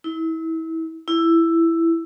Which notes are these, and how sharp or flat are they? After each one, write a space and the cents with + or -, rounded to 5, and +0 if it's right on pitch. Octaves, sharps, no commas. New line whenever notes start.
E4 -30
E4 +10